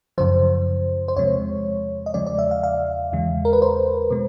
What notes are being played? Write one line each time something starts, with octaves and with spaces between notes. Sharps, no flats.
F#2 C#3 F3 C5
C5
E2 C3 F3 G#3 C#5
D#5
E2 C#3 F3 G#3 D5
D5
E5
F5
F5
E2 C#3 E3 G#3
A#4
B4
C5
B2 G#3